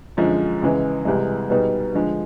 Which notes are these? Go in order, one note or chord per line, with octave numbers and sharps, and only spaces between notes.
F#2 D3 F3 G#3
C#2 C#3 E3 G#3
C2 C3 E3 G#3
B2 G3 B3 D#4 G#4
D3 F3 G#3